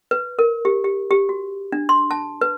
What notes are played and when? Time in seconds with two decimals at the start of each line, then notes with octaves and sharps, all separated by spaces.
0.11 B4
0.39 A#4
0.65 G4
0.84 G4
1.11 G4
1.29 F#4
1.72 D4
1.89 C6
2.11 A5
2.41 B4